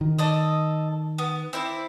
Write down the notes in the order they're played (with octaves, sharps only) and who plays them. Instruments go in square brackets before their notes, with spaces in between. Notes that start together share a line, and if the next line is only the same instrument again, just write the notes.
[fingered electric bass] D#3
[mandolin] A4 D5 D#5
B3
C4 E4 D5